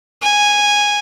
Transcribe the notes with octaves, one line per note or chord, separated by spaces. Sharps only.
G#5